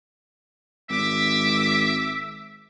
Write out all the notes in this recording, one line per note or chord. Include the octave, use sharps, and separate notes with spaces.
G#1 E5 D6 B6